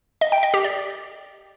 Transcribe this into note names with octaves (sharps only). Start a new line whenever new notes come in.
D#5
G5
D#5
G4
D5